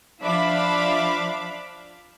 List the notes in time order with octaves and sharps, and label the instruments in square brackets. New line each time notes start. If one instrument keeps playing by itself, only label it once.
[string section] F3 D4 E5 F5 B5 D6